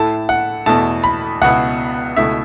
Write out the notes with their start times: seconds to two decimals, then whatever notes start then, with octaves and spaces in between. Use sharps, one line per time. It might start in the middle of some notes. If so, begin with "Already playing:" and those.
Already playing: A2 A3 E4 A5
0.29 F#5
0.66 E2 B2 A3 E4 A5
1.04 B5
1.41 C#2 B2 B3 E4 F#5
2.16 C#2 B2 A3 E4 E5